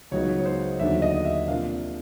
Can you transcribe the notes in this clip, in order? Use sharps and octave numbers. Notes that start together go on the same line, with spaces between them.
C#2 C#3 F#3 B3 D#4 C#5
C#5
C5
D#2 D3 F#3 B3 D4 E5
D#5
E5
C3 F3 A#3 D4 F5